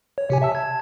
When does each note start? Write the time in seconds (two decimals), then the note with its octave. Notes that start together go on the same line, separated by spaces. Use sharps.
0.18 C#5
0.30 C3 G4 G#5
0.42 E5 A5 E6
0.55 A5 G#6